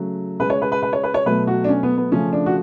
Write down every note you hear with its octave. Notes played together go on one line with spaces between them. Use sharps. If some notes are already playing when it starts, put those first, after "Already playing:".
Already playing: C#3 F#3 A3
C#3 G#3 B4
C#5
B4
B4
B4
C#5
B4
C#5
B2 F#3 A3 B4
F#4
D4
C#4
B3
B3
C#3 F3 A3 C#4
D4
F#4